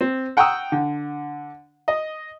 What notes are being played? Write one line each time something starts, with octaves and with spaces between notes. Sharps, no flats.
C4
F#5 G5 A#5 C#6 D#6 E6
D3
D#5